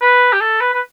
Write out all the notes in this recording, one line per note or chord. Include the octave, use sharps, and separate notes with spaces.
B4
G4
A4
B4
B4